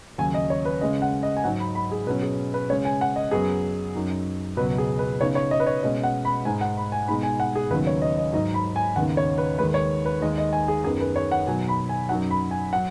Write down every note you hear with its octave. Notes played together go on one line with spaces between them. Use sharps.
D#2 C#3 F#3 G#5
D#5
C#5
B4
C#3 G#3 C#4 D#5
F#5
D#5
G#5
G#2 F#3 D#4 F#5
B5
B5
G#4
B2 F#3 C#4 B4
G#4
B4
C#3 G#3 C#4 C#5
G#5
F#5
D#5
F#2 F#3 B3 G#4
F#2 F#3 D#4
C#2 B2 F#3 B4
G#4
B4
C#3 B3 D#4 C#5
C#5
D#5
B4
C#5
B2 G#3 C#4 D#5
F#5
B5
G#2 G#3 D#4 G#5
F#5
B5
G#5
B2 G#3 D#4 B5
G#5
F#5
G#4
D#2 C#3 F#3 B3 D#4 B4
C#5
D#5
D#5
G#2 F#3 D#4 D#5
B5
G#5
D#2 C#3 B3 D#4 F#5
C#5
B4
D#2 D#3 G#3 B4
C#5
B4
D#2 D#3 G#3 D#4 D#5
D#5
G#5
G#4
F#2 D#3 B3 G#4
B4
C#5
F#5
B2 F#3 D#4 G#5
B5
G#5
F#2 F#3 D#4 F#5
B5
G#5
F#3 F#5